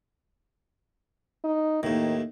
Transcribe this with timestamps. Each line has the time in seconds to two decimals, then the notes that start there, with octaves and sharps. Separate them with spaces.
1.44 D#4
1.83 D#2 A2 D#3